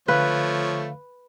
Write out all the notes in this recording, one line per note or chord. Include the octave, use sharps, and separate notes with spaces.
D3 F3 A3 B4 C#5 F5